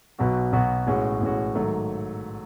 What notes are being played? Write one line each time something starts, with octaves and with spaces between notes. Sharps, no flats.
B1 B2 F#3 B3 F#4
B1 B2 F#3 B3 F#4
A1 A2 G#3 C#4 F#4
A1 A2 G#3 C#4 F#4
G#2 D#3 F#3 A3